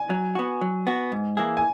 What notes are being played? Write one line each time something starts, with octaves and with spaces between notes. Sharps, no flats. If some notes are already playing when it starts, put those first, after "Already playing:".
Already playing: G#5
F#3
B3 F#4
F#3
B3 F#4
G#2
E3 A#3 E4 G#4
G#5